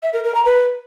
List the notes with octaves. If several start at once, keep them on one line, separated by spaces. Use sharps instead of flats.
E5
A#4
A#4
A#5
B4